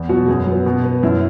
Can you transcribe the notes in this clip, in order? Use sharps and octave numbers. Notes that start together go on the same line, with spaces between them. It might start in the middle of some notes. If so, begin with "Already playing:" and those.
Already playing: E2
B2 F#3 F#4
F#2 G#4
F#3 B3
B2
B3
F#2 E4